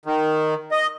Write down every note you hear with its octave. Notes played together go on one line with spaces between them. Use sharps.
D#3
D#5